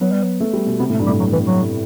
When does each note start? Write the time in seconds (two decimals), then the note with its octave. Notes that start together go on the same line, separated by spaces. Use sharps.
0.01 F#3 B3
0.12 G3
0.23 F#3
0.40 A3
0.53 G3
0.67 B2
0.79 C3 B3
0.90 A2
0.93 A3
1.00 G2
1.06 A2 G3
1.19 G2 F#3
1.32 E3
1.45 F#3